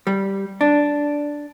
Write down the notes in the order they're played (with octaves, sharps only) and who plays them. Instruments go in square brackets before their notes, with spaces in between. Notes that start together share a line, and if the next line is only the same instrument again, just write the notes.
[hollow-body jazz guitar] G3
D4